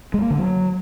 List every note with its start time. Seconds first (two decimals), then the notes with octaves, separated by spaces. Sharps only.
0.14 G#3
0.22 A#3
0.30 D3
0.39 F#3